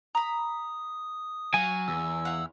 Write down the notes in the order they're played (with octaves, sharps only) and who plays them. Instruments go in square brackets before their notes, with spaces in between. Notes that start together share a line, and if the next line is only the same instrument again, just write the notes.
[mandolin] A#5 B5 [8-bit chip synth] D#6
[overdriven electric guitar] F#3 [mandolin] F5 [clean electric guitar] G#5
[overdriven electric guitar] E2 [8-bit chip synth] E6
[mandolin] E4 F5 F#5